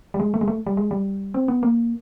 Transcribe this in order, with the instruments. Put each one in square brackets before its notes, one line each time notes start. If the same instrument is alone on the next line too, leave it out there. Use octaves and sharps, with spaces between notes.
[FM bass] G3
G#3
A3
G#3
A3
G3
G#3
G3
C4
B3
A#3